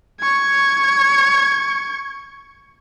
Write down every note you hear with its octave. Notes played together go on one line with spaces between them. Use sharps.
C#6 G#6